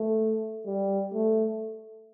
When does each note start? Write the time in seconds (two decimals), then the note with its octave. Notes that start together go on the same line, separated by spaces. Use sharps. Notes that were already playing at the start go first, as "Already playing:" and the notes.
Already playing: A3
0.67 G3
1.14 A3